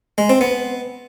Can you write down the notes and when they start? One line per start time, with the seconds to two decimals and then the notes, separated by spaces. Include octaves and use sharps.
0.18 G#3
0.29 C4
0.41 B3